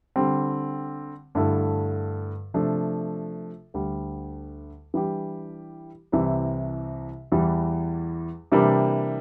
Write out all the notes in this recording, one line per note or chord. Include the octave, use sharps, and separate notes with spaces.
D3 G3 C4
G2 D3 A3 E4 A4
C3 F3 A3 D4 A4
D2 D3 G3
E3 G3 D4 G4
C2 C3 E3
E2 E3 G3
C3 E3 G3 A#3 D4